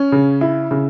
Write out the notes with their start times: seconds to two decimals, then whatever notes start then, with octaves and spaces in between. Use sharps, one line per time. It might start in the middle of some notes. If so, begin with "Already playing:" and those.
Already playing: C#4
0.12 C#3
0.41 E4
0.71 C#3